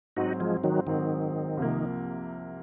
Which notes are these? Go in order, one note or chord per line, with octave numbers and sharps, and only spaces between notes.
G#2 F#3 C4 D#4 F#4
F3 G#3
D#3 F#3
G#2 D#3 F#3 C4
C2 C3 F3 A#3